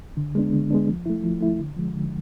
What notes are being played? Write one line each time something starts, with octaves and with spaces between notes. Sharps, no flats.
D3
G#3 B3 D4
D3
G#3 B3 D4
F3
A3 E4
F3
A3 E4
D3
F3 G#3
D3